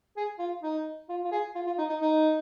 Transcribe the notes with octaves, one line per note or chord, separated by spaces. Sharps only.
G#4
F4
D#4
F4
F4
G#4
F4
F4
D#4
D#4
D#4